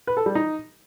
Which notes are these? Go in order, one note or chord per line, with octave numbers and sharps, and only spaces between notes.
B4
A4
G3
D#4